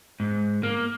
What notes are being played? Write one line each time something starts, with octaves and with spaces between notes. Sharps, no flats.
G#2
A#3